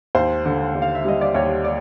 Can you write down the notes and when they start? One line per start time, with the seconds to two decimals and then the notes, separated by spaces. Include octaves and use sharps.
0.15 D#2 C5
0.45 D3
0.75 D#2
0.82 F5
0.95 E5
1.05 G3 D#5
1.21 D5
1.35 D#2 C#5
1.64 D5